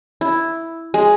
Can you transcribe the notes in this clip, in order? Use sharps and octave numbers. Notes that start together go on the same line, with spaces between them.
E4
G#3